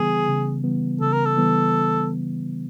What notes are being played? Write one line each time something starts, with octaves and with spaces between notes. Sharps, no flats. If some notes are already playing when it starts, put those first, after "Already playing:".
Already playing: C#3 E3 G3 B3 G#4
C#3
E3 G3 B3
C#3 A4
A#4
A4
E3 G3 B3